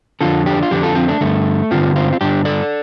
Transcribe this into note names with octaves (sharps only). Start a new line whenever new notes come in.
F2 D3 F4 A4
D4 G4
F4
F2 D3 D4 G4
F4 A4
C4 F4
A3 D4
G2 D3 A3
G2 D3 C4 F4
C4 F4
F4
G2 D3 D4 G4
A4 D5